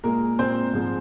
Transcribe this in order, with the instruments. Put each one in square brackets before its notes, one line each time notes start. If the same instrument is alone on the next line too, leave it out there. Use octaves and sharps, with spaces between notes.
[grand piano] A#2 G#3 A#3 A#4
A#2 G#3 C4 C5
G#2 F3 G#3